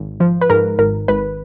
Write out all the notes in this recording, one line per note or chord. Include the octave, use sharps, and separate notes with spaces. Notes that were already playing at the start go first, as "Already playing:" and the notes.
Already playing: G#1
F3
B4
G#2 A#4
G#1 A#4
G#1 B4